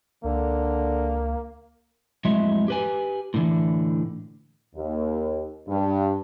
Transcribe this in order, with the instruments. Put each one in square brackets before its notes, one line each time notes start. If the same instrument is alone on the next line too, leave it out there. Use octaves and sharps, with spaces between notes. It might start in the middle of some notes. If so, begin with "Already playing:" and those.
[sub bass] C#2 [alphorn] D3 [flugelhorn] A#3
[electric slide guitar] F2 A2 F#3 G#3 E5
G4 B4 G#5
A2 D3 E3
[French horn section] D#2
G2